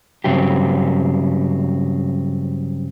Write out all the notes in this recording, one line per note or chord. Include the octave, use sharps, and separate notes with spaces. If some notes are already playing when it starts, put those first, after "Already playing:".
G2 C#3 F#3 C4 G4